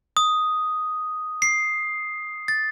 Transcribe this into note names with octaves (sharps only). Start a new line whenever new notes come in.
D#6
C7
A6